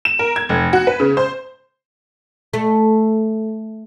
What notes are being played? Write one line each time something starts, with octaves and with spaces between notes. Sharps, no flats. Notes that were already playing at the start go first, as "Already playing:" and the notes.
E7
A#4
G#6
F1
F#4
B4
C#3
C5
A3